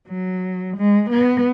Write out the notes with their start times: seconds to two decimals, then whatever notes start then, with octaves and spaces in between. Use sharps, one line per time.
0.08 F#3
0.77 G#3
1.11 B3